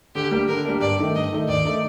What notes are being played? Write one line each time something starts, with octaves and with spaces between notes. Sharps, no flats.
D3 G4
G3 A#3 D4
D3 A#4
G3 A#3 D4
G2 D5
D#3 A3 D#4
G2 D#5
D#3 A3 D#4
D#2 D5
D#3 A3 D#4